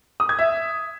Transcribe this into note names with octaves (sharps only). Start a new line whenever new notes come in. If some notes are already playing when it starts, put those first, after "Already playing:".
D#6
G#6
E5